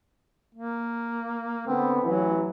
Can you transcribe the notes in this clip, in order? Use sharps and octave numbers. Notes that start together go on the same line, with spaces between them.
A#3
D3 B3 C4
A1 E3 F#3